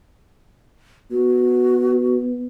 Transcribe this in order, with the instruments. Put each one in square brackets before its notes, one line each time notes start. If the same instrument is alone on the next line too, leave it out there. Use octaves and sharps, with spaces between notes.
[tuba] B3 [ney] F#4